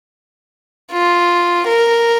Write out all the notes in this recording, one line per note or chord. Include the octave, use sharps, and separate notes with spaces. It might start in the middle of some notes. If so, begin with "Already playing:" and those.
F4
A#4